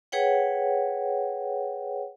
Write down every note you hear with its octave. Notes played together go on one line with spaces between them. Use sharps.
G#4 B4 C#5 F#5 G5